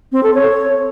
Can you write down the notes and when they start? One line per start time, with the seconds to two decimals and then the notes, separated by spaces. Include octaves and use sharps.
0.12 C4
0.23 A4
0.34 C#5